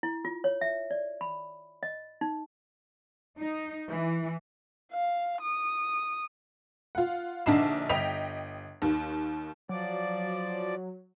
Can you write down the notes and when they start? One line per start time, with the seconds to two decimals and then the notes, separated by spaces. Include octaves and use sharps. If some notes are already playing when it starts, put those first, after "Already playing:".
0.03 E4
0.25 F4
0.44 C#5
0.61 E5
0.91 D5
1.21 B5
1.83 D#5
2.21 D#4
3.39 D#4
3.89 E3
4.92 F5
5.41 D#6
6.95 F4 F#5
7.46 A#1 D3 D4 D#4 C7 E7
7.89 G1 D#5 G5 B6 F7
8.82 D#2 D#3
9.69 F3 F#3 D5